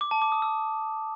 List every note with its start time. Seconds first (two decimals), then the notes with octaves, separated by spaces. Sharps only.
0.01 D6
0.11 A5
0.22 D6
0.32 D#6
0.42 E6